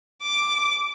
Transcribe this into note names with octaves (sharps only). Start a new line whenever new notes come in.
D6